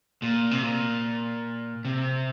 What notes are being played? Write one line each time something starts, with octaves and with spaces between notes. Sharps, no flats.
A#2
C3
A#2
C3